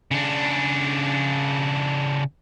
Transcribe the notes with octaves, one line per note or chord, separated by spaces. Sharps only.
C#3 D4